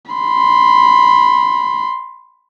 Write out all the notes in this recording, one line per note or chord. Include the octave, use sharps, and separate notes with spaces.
B5 C6